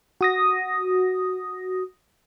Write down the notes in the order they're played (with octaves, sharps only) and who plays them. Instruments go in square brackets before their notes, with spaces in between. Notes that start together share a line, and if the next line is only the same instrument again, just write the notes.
[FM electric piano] F#4 D#6 A#6